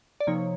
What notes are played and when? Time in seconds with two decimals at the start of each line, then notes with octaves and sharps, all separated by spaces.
0.20 D5
0.27 C3 F3 A#3 D#4 C#5